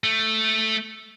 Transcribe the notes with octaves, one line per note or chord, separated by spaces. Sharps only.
A3